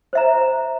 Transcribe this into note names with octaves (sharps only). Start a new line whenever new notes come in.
C5 E5 A#5